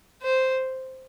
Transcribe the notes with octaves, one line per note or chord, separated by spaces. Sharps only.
C5